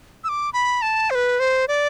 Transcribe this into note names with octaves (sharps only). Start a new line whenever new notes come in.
E6
D6
B5
A5
C5
B4
C5
D5